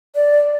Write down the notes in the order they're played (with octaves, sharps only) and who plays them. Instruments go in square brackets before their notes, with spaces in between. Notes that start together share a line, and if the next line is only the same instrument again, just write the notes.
[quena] D5